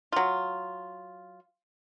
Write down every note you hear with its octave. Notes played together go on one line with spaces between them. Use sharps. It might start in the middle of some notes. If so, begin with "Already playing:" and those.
F#3 F4